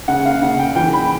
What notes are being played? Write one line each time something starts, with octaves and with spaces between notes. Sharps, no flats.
C#3 F#5
F5
C#3 F#5
G5
E3 G5
B5